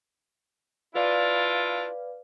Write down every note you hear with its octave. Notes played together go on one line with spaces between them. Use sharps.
D4 E4 F4 B4 D5 F5